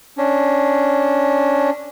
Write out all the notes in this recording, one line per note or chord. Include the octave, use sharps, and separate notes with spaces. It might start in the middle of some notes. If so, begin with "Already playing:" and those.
C#4 D4